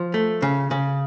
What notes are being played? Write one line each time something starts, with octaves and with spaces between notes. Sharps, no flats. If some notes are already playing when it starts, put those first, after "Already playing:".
Already playing: F3
A3
C#3
C#3